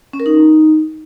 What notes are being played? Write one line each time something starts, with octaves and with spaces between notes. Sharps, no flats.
C#4
A#4
D#4